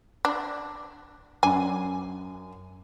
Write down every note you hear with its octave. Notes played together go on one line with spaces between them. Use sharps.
D4
F#2 D4 G#5